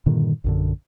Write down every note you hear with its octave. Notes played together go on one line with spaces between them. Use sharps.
G2 A#2 D3 D#3
A#1 F#2 D3